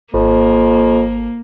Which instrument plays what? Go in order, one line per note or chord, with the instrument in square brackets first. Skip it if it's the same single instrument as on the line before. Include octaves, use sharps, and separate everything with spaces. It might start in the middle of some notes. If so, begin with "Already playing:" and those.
[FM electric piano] G#1 [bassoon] F2 [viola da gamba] A#3